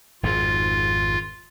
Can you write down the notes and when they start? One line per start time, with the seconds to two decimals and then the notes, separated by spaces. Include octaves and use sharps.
0.23 G#1 F2 G#2 F4